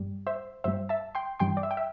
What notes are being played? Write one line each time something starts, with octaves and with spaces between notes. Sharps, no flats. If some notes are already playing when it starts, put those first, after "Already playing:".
Already playing: G2 G3
C5 E5
G2 G3 C5 E5
E5 A5
G5 C6
G2 E3 G3 G5 C6
D5
E5
G5
E5